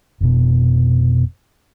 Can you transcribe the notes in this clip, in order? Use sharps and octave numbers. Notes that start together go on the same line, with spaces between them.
F1 B2